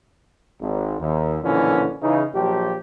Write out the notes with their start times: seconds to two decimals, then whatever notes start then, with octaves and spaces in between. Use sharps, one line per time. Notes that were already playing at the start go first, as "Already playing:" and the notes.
0.61 G#1
1.00 D#2
1.43 B1 A#2 D3 E3 F3 C#4
2.02 C#3 E3 D#4
2.34 A#1 F3 F#3 G4